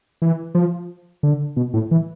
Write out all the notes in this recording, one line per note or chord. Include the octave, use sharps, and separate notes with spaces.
E3
F3
D3
B2
A2
E3